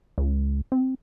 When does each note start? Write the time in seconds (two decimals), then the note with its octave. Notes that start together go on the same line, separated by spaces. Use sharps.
0.18 C#2
0.72 C4